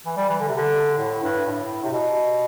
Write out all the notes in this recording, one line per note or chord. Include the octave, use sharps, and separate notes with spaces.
E3
G3
E3
D3
C3
D3
A2
G2
A2
C3
B2